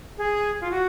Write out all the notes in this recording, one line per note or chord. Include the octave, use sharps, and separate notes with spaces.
G#4
F4
F#4